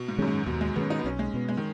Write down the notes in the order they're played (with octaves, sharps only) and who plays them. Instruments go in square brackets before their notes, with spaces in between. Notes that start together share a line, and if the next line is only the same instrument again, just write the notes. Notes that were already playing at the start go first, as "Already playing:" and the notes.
Already playing: [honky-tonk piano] B2
G#2
[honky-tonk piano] F#2 [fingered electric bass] D#3 G#3 C#4
[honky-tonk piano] G#2
[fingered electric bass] D#2 [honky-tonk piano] B2
[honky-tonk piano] G#3
[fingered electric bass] D#3 G#3 C#4 [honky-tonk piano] B3
[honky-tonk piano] D#4
B3
[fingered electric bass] B1 [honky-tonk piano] C#4
[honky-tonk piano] G#3
[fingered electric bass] B2 B3
[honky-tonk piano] G#3
D#3